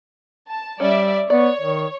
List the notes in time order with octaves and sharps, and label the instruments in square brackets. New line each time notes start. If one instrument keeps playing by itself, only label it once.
[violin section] A5
[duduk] G3 [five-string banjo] C#4 [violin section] D5 E5
[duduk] B3 [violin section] C#5 [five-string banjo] D5
[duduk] D#3